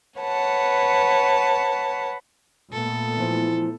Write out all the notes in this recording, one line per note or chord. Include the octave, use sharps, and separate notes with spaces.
B4 C#5 F#5 A5
A#2 A3 B3 A4
E3 F3